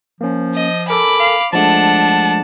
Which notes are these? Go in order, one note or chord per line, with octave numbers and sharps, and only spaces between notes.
F3 A#3 C#4
D#5
A4 A#4 G#5 B5 D6
F5
F3 G#3 A3 D4 F#5 A5